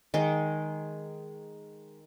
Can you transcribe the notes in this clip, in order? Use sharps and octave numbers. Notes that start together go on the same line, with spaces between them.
D#3 G#3 G#4